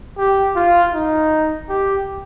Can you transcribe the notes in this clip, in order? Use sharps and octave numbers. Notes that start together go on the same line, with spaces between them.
G4
F4
D#4
G4